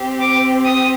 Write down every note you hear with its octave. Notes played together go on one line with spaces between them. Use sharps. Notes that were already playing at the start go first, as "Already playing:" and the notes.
Already playing: C4 G4
D6
D#6